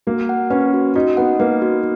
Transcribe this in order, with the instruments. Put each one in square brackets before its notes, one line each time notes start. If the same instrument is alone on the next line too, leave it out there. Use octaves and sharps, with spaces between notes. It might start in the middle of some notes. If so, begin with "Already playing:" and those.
[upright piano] A#3 [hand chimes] F#4
[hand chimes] F#5
[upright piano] C#4 [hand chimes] B4
[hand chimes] F#4
[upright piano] D#4 [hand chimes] F#4
[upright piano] B3 [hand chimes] F#5
[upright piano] A#3 [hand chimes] B4
[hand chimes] F#4